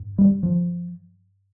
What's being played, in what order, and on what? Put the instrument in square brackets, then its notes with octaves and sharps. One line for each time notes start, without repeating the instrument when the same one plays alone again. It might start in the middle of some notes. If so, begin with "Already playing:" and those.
Already playing: [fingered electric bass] G2
G3
F3